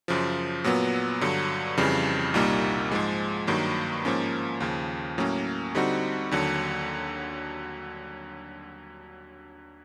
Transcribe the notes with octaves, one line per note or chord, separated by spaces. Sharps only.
F#2 C#3 F3
A#2 F#3 B3
G2 D3 F#3
F2 C#3 E3 G3
C2 A#2 G3 A#3 D#4
G#2 F3 G#3
G2 D#3 F#3 A#3
G#2 F3 A#3 C#4
D#2 C#3 F3
A2 F#3 A#3 C#4
D3 G3 C4 D#4 F#4
D#2 D3 F#3